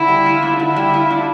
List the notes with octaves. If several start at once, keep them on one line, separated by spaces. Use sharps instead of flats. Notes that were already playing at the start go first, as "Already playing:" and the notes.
Already playing: D3 E4
G3
F4
D4
D3 E4
G3
F4
D4